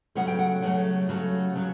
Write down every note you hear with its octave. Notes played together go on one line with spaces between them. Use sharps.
C#3 F#3 A3 F#5
G5
F#5
C#3 F#3 A3
C#3 F#3 A3 F#4
C#3 F#3